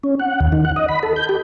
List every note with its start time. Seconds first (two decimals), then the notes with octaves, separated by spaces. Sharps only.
0.03 C#4
0.20 F#5
0.40 D#2
0.52 D#3
0.65 F#5
0.76 D#5
0.89 B5
1.03 A4
1.16 G6
1.29 G4